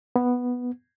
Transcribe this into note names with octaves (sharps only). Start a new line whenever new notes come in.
B3